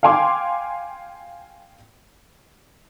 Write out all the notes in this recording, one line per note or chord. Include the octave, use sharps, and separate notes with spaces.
F5 G5 G#5 C6 D6